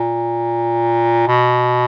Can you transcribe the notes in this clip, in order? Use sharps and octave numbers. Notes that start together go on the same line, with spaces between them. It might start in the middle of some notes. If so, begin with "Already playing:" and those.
Already playing: A#2
B2